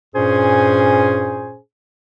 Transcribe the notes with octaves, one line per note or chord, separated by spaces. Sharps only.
G2 A#2 C#4 G#4 C5 G#5